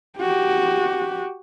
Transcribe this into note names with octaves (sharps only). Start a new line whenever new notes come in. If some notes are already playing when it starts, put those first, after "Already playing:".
F#4 G4